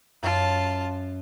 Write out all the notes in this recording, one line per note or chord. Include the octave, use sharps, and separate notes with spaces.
F#2 F4 A5